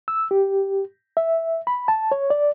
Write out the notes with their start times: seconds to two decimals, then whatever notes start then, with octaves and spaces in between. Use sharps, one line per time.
0.08 E6
0.31 G4
1.17 E5
1.67 B5
1.88 A5
2.12 C#5
2.30 D5